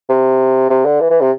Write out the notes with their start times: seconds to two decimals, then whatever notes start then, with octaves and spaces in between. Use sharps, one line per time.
0.09 C3
0.70 C3
0.85 D3
1.00 E3
1.10 E3
1.21 C3